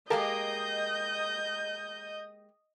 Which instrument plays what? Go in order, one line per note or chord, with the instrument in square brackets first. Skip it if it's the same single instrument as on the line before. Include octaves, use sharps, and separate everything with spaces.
[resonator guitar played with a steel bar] G#3 A#3 G4 [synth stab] A4 A#4 A5 [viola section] D#5 [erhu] G6